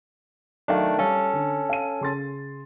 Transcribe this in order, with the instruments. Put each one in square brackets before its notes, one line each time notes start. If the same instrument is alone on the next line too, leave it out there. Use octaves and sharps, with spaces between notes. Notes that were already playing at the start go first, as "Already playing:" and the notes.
[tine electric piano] D#3 A3 D4 [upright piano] F#3 F5
[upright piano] G3 F5 [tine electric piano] C#4 A4
[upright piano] D3
F5 D#7
C#3 C6 A6